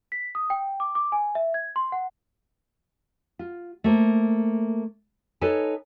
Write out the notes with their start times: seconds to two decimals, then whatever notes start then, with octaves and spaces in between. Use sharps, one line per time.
0.12 B6
0.35 D#6
0.50 G5
0.80 D6
0.95 D6
1.12 G#5
1.35 E5
1.54 G#6
1.76 C6
1.92 F#5
3.39 F4
3.84 A3 A#3 C5
5.41 D#4 A4 B4 C#5 G#5 A5